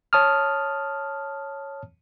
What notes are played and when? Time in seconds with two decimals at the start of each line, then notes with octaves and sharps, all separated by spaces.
0.13 C#5 A5 D#6 F6